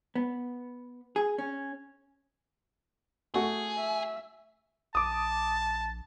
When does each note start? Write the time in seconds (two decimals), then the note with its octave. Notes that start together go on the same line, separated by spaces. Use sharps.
0.15 B3
1.16 G#4
1.38 C#4
3.34 A3 F#4 G#4
3.78 E5
4.95 A#1 A5 D6 D#6